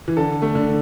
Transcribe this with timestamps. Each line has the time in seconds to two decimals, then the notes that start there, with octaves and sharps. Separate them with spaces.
0.08 E3
0.17 D3 A4
0.42 A3
0.55 D3